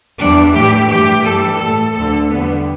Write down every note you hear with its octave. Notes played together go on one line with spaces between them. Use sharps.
E2 E3 G3 D4
A2 E3 A3 G4
G2 E3 A3 G4
G2 E3 G3 A4
A2 A3 A4
D2 D3 A3 A4
E2 D3 G3 B3